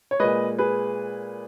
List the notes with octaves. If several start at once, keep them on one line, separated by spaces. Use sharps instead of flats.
C#5
A#2 G#3 B4 D#5
G#4 B4